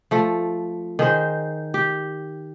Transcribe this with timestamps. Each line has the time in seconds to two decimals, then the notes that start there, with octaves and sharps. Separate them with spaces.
0.11 F3 A3
0.99 D#3 G#4 C5
1.74 G4